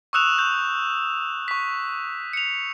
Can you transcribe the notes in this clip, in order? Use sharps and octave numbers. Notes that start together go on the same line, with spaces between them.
C#6 D#6 E6 F#6 E7 F7
C#6 G6
C#6 B6
C#7 F7